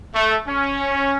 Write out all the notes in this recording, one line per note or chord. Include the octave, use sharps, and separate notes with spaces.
A3
C#4